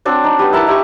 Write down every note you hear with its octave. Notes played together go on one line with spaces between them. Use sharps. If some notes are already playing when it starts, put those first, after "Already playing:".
C4 D4 F#4 C#5
D4 D#4
G3 B3
E4 A#4 F#5 A5
D#4 E4 G4 C#6